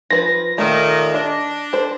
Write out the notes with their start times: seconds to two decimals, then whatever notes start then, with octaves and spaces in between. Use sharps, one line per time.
0.10 F3 B4 A#6
0.58 D#2 A#2 D#3 A3
1.14 D4 D#5
1.73 A4 C5